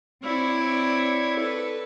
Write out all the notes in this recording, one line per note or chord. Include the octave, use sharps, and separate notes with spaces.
C4 E4 C#5 D5
A4 B4